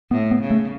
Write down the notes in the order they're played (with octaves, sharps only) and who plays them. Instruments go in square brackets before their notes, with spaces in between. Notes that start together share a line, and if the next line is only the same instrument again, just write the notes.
[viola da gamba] A2 [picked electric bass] B3
[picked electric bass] B3
[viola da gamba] C#3
[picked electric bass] A3